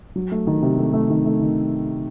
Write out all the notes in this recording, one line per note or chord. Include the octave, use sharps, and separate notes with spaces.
F#3
A3
D#3
C3
A3
A3
D#3
A3
D#3